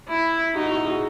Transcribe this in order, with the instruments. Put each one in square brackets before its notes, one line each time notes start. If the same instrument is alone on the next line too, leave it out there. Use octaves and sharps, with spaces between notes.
[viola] E4
[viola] D#4 [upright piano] E4 F#4
[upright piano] E4 F#4
F#4 G#4